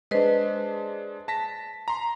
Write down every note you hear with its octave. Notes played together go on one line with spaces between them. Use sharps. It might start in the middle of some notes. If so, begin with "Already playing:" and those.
G#3 D4 B4 C5 D#5
A5 A#6 B6
A#5 C6